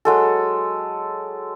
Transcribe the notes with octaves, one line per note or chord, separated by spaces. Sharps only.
F#3 G#3 A4